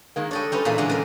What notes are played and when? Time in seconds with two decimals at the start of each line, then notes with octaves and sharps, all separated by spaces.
0.16 D#3 G#3 A#3
0.31 G3 D4 A4 C#5 D#5
0.52 G3 C#4 D#4 F4 B4
0.65 E2 A#2 E3 G#4 F5
0.78 D3 E3 G#3
0.89 C#3 A#4